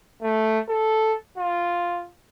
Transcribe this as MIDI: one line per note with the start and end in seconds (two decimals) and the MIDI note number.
0.22 0.60 57
0.68 1.15 69
1.38 2.06 65